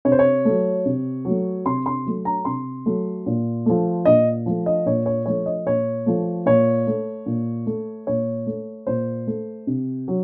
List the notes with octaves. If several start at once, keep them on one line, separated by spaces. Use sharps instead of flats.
C3 C#5
C5
C#5
F#3 A3
C3
F#3 A3
C3 C6
C6
F#3 A3
A#5
C3 C6
F#3 A3
A#2
F3 A3
A#2 D#5
F3 A3
D#5
A#2 C#5
C#5
F3 A3 C#5
D#5
A#2 C#5
F3 A3
A#2 C#5
A3
A#2
A3
A#2 C#5
A3
A#2 C5
A3
C3
F#3